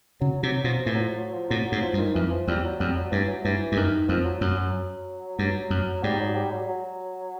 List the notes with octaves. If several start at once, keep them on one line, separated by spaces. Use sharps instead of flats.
C#3 F#3
C3 F#3
B2 F3
A2 E3
F#3
F3
F#3
F3
A2 F#3
F#3
G#2
F3
G2
D#3
F2 E3
F3
E2 G3
F#3
F2 G3
F#3
G2 E3
F#3
G2 E3
G2
F#2 D#3
F2 F3
F#3
F#2 F#3
F#3
G2
F#2
G#2 G3
F#3
G3
F#3
F#3